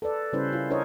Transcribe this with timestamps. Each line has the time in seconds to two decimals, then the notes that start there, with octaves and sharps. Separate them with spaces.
0.02 A4 B4 D5
0.33 C#3 G3 C#4 E4 B4 C5
0.52 E4 F4
0.70 D4 E4 A#4 C5 C#5 D#5